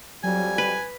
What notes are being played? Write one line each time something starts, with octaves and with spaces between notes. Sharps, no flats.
F2 F#3 G3 G#5
B4